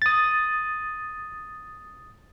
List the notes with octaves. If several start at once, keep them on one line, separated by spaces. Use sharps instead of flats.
D#6 A6